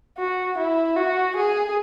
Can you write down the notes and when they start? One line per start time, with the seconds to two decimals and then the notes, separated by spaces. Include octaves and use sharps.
0.18 F#4
0.57 E4
0.96 F#4
1.36 G#4